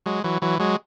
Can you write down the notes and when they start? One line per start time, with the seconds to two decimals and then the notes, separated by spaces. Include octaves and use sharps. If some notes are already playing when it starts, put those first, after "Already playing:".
0.06 F#3 G#3
0.24 E3 F#3
0.42 E3 F#3
0.59 F#3 G#3